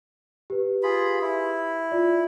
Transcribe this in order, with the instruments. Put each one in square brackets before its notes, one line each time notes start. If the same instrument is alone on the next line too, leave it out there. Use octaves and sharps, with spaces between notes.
[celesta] G4 B4
[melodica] F4 G#4 B5
E4
[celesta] F4 D5